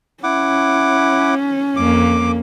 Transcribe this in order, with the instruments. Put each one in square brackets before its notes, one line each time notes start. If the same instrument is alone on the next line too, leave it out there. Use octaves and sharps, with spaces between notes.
[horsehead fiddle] C#4 [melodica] E4 F#5 D6
[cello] F2 A#3 [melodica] D6